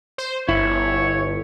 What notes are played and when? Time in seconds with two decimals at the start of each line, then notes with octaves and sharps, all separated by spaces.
0.18 C5
0.49 G1 E4 C#5